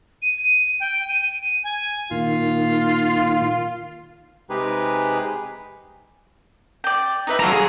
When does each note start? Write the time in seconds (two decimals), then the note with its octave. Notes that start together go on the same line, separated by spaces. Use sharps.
0.22 D#7
0.80 G5
1.08 D#7
1.64 G#5
2.11 A#2 D#3 F4
4.50 C3 G#3 D#4 G4 G#4 B4
6.84 D5 G5
7.27 D#4 B4 E5
7.40 F#3 A4 F5 A#5 C6
7.53 G#4 C6